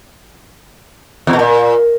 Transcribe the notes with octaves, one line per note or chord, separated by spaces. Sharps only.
E2
B2
A#2